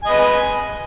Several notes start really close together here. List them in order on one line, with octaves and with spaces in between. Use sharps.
G#5 D#5 B4